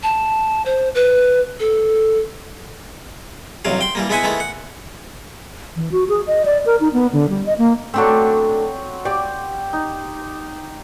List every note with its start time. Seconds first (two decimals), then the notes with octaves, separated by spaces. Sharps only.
0.03 A5
0.66 C5
0.95 B4
1.60 A4
3.65 A1 G2 C3 F#3 F5
3.81 G5 C6
3.95 E3 G3 A#3
4.09 G#3 B3 E4 E5 F#5 G#5
4.23 D#3 G#3 A3 B3 E4
4.40 F#5
5.76 E3
5.92 F#4
6.09 G#4
6.27 D#5
6.45 D5
6.66 A#4
6.81 D#4
6.93 B3
7.13 D3
7.29 G3
7.46 D#5
7.58 A#3
7.94 F#3 A3 C4 D4 A4
9.05 G4 D5
9.73 D#4